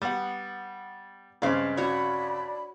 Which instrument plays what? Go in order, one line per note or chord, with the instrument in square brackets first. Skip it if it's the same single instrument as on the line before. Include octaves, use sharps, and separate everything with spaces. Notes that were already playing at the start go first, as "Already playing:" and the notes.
[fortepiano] G3 F#5 [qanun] B3
[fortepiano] G2 C#3 C4 [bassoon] G#3 [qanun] D5 F5
[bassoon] D4 [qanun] F#4 C#5 [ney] B5